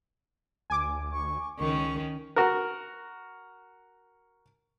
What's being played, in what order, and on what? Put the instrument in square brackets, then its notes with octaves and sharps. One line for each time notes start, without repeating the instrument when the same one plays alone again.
[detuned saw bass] D2 [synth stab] G#5 D6
[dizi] C#6
[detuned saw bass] C#2 [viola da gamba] D#3 C#4 [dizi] C#6
[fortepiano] F#4 A#4